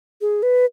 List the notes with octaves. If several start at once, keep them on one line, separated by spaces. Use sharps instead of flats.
G#4
B4